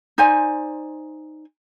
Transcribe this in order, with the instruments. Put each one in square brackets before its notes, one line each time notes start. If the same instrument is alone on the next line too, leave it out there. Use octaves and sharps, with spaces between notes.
[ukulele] D#4 C5 D5 G#5